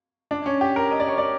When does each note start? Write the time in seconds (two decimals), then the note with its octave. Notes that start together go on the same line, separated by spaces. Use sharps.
0.31 D4
0.46 C#4
0.61 G4
0.76 A#4
0.91 D#5
1.00 D5
1.08 C#5
1.18 D5